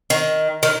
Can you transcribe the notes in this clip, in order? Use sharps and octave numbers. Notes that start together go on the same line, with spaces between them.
D#3
D#3